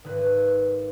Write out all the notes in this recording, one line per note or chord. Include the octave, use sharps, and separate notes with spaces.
G#1 B4